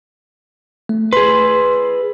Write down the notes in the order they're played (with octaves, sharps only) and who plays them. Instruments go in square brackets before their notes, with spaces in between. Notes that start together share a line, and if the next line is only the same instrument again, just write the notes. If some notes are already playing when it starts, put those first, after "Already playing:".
[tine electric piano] A3
[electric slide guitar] G#4 B4 [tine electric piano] C6